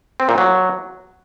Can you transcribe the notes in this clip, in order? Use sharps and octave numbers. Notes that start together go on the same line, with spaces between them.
C4
A#2
F#3